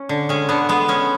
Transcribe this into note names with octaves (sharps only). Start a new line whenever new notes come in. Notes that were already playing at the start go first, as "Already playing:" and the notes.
Already playing: C#4
D3
G#3 C#4
D3 B3
G#3 B3
G#3 C#4